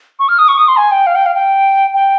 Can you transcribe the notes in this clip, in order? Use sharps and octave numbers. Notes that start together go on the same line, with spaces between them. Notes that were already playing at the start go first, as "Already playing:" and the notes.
C#6
F6
D#6
C#6
D#6
C6
G#5
G5
F5
G5
F5
G5
G5